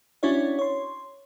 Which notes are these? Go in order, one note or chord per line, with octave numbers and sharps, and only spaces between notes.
C#4 D4 E4 F#4 C#5 D5
C#5 C6